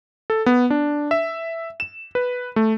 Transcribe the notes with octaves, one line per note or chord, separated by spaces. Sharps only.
A4
B3
D4
E5
E7
B4
A3